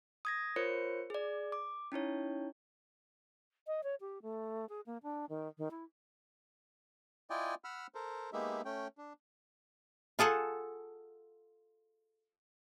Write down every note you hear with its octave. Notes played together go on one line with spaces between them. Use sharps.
D#6 G#6 A#6
F4 A#4 C5 C#5 C#7
G#4 D5
D6
C#4 D#4 E4 C#5
D#5
C#5
G4
A3
G#4
A#3
D4
D#3
D#3
E4
E4 F4 D5 D#5 G5 G#5
F#5 B5 E6 F6
A4 A#4 C5
G#3 A#3 B3 D#4 G4 E5
A3 C#4 G5
D4
F4 G#4 A4 F#5